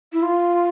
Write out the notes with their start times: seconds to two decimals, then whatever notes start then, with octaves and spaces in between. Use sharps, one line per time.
0.13 E4
0.22 F4